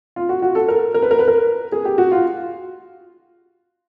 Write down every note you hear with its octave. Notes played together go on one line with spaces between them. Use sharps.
F4
F#4
F#4
A4
A#4
A#4
B4
A#4
B4
A#4
G#4
G4
F#4
F4